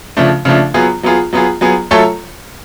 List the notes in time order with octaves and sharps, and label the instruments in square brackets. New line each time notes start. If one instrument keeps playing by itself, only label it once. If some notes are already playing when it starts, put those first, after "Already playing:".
[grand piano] C#3 F3 A3 D4
C#3 F3 A3 D4
F#3 B3 F4 G#4
F#3 B3 F4 G#4
F#3 B3 F4 G#4
F#3 B3 F4 G#4
F#3 A3 F4 A4 C#5